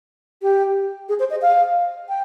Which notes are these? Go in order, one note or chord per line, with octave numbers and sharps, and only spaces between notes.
G4
G#4
C5
D#5
F5
G5